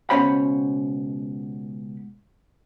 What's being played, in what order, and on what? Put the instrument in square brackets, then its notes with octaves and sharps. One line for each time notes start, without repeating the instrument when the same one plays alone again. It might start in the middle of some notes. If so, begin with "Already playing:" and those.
[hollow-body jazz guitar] C#2 B2 C#4 C5 C#5 B5